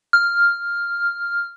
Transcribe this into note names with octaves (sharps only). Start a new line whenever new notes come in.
F6